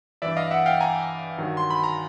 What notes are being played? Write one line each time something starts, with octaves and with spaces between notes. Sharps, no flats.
G2 E3 D5 E5
D#5 F5
E5 F#5
F5 G5
G#5 A#5
G2 D#3 F#3
C6
B5
A#5